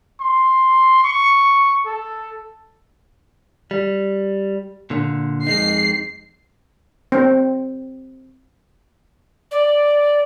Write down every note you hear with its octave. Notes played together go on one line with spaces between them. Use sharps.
C6
C#6
A4
G3
A#2 D3
F2 G#3 D#4 C7
C4
D5